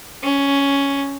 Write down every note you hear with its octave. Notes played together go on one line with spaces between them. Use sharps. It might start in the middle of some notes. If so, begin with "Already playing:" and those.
C#4